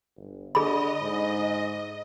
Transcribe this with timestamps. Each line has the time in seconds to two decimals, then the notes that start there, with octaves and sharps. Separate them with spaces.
0.17 G1
0.55 D3 G#4 D#5 B5
1.01 G#2